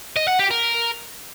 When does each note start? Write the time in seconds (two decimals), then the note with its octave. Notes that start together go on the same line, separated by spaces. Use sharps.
0.16 D#5
0.28 F#5
0.39 G4
0.51 A#4